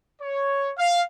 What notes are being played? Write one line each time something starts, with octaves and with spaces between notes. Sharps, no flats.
C#5
F5